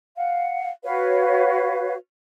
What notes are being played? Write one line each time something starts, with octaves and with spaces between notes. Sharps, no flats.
F5 F#5
F#4 B4 C#5 F5